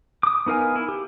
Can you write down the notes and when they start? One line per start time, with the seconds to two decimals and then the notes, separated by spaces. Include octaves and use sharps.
0.23 D6 D#6
0.46 B3 D#4 A#4 F5 G#5
0.76 E4
0.89 G4